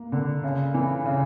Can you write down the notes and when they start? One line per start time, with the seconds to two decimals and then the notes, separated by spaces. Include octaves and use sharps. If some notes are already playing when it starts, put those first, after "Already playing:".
Already playing: A#3
0.12 D3
0.44 C#3
0.74 E3
1.06 C#3